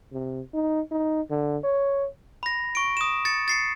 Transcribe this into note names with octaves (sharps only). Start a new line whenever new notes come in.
C3
D#4
D#4
D3
C#5
B5 A#6
C#6 D7
D#6 E7
A6 C#7
A6 C7 C#7